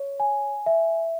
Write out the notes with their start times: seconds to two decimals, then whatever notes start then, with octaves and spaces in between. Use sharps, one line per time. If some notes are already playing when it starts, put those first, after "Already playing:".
Already playing: C#5
0.20 G#5
0.66 E5